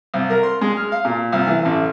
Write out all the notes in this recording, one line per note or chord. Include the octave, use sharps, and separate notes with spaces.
C2
A#4
C6
G#3
F6
F5
A#2
C2
E3
A1